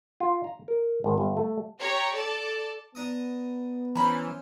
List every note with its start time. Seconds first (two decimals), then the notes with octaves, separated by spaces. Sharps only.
0.20 F4
0.44 A#5
0.68 A#4
1.04 G#1
1.18 G1
1.37 A3
1.80 G4 C#5 A#5
2.16 A4 D5 A5
2.95 B3 D4 A#5 D#6
3.95 E3 C#4 C5 A#5 B5